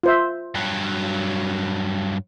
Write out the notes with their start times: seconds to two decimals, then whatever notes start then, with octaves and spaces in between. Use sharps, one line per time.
0.03 F4 C5 E5
0.55 G2 F#3